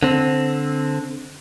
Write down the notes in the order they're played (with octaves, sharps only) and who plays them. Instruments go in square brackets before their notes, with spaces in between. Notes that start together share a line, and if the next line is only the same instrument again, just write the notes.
[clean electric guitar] D3 C4